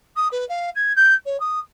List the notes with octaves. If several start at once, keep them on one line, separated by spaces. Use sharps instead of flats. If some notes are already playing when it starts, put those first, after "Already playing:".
D#6
B4
F5
G#6
G6
C#5
D#6